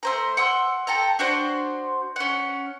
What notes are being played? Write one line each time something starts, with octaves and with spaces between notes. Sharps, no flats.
A3 C5 A#5
F#5 C6 E6
A4 G5 A5 A#5
D4 F#4 C5
C#4 F#5